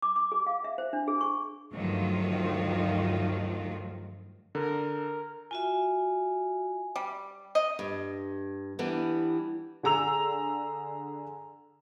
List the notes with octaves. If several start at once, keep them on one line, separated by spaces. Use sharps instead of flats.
D6
D6
G#4
F5
E5
C5
D4
G#4
C#6
D2 G2 D#3 F3 F#3 F4
D3 A#4
F4 F#4 E5 G#5
G3
D#5
G2
E3 G3 B3 D4
D3 G#4 A#5 E6 F7